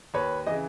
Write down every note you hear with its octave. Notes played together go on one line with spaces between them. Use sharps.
D#2 B4 C#5
C#3 E3 D#5